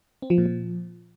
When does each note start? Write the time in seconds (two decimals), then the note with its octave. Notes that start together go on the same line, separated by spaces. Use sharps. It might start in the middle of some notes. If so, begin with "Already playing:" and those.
0.22 C4
0.30 F3
0.38 A#2
0.46 F3